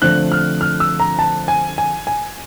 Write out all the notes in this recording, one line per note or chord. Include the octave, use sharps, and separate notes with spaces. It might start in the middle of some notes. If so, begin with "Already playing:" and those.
D3 F3 A3 C4 F#6
F6
F6
E6
A#5
A5
G#5
G#5
G#5